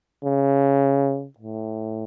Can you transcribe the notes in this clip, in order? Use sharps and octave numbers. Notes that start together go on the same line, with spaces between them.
C#3
A2